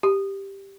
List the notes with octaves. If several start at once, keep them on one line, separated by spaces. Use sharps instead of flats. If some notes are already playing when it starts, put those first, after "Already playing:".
G4